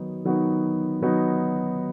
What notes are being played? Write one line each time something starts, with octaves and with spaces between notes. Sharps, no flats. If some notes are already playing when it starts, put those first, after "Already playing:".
Already playing: D#3 F#3 B3 D#4 F#4
D#3 F#3 B3 D#4 F#4
D#3 F#3 B3 D#4 F#4